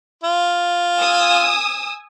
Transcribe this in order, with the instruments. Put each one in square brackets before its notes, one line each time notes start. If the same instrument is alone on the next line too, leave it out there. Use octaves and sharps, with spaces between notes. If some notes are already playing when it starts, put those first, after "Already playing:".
[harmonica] F4
[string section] G#5 D#6 E6